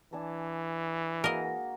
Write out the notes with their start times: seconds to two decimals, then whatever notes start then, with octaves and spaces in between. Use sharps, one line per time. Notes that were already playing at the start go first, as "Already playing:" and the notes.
0.13 E3 D4 G#5 A5
1.24 G#3 A#3 F#4 A#4 D#5